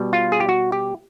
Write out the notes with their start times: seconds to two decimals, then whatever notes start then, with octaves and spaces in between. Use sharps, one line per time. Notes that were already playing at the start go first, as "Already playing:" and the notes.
Already playing: B2 G3
0.13 F4
0.32 G#4
0.40 G4
0.49 F#4
0.72 G4